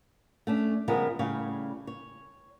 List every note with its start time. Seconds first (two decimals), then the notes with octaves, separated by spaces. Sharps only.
0.47 A3 C#4 D4
0.88 C#3 F3 G3 G#3 B3 A#4
1.19 A2 C#3 G3 C#5 F5
1.87 C#5